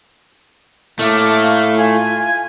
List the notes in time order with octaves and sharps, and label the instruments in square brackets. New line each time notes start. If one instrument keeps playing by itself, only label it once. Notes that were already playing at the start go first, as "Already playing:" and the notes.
[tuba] A2 [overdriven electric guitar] A3 [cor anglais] A#3 [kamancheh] E5 D6
[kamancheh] F5
[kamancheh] F4 [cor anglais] G#5